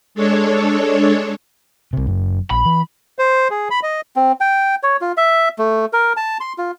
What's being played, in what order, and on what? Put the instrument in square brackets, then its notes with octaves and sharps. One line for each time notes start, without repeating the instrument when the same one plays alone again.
[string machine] G#3 D4 A4 C#5
[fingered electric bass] C2 C3
F#1 F#2
[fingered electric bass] A#1 [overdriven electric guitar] B5
[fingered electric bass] E3
[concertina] C5
G#4
B5
D#5
[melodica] C4
G5
C#5
F4
E5
A3
A#4
A5
C6
F4